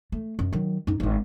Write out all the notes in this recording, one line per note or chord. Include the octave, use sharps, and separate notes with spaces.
A3
F#2
D#3 F#3
F#2 D#4
G#1 D#4